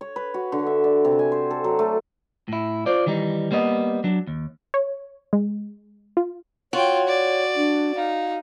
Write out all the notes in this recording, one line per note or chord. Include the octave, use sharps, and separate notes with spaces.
C#5
B4
F#4
D3
E5
D5
C3
G#5
C5
A4
F#3
A3
A2 E4
F4 C5 D5
D#3 E3 G3 D#4
G3 A#3 B3 B4 D#5
F#3 D4
D#2
C#5
G#3
F4
F4 F#4 C#5 G5
D5
D4
D#4 F5